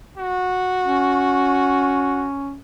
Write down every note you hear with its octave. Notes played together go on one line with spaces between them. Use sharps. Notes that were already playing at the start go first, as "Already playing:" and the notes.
F#4
C#4